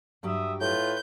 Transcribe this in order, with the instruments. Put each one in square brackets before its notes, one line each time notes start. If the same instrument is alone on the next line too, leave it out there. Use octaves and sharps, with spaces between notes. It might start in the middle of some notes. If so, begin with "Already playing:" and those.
[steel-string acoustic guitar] G2 F#3 G4 [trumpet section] E5 D#6
[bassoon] A2 [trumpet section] F4 B4 [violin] G6